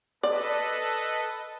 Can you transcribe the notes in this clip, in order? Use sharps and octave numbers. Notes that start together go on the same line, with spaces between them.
A4 B4 D5 D#5